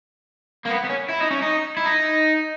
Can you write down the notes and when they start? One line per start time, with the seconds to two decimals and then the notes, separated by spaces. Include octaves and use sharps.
0.66 A#3
0.71 B3
0.85 B3
0.90 C#4
1.09 E4
1.20 D#4
1.31 C#4
1.42 D#4
1.77 E4
1.86 D#4